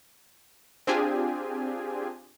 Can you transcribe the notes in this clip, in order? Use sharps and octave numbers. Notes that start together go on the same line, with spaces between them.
C4 D4 F4 G4 G#4 G#5